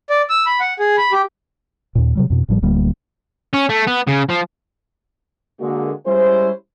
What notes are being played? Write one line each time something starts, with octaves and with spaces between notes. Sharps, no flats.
D5
E6
B5
F#5
G#4
B5
G4
D#2 A#2
C3 F#3 G3
F2 B2
A1 A2 F3 G3
D1 D2 G3 A#3
C#4
A3
B3
C#3
F3
D3 G#3 A#3 F#4
G3 G#3 C#4 E4 C5